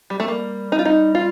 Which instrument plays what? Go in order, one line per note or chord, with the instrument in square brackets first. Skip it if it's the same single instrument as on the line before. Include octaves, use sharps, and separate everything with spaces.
[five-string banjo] G3
A3
[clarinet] G3 [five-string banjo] A#3
[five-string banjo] D#4
F4
D#4
F4